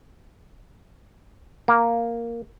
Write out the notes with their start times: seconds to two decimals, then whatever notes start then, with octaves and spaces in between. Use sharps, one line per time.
1.68 A#3